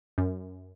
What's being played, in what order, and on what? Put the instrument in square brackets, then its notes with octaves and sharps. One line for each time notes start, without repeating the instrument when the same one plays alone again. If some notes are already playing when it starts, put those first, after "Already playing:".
[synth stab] F#2